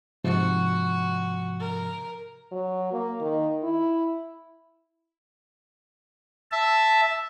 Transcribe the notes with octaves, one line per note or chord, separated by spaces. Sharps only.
G#2 C3 F3 F#4
A#4
F#3
A#3
D#3
E4
E5 A5